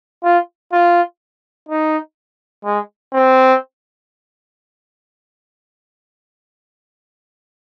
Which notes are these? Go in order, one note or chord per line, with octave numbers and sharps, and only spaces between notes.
F4
F4
D#4
G#3
C4